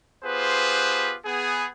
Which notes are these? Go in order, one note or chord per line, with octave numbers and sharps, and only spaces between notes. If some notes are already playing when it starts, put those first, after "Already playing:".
B3 F4 G4 G#4 B4 C5
B3 G#4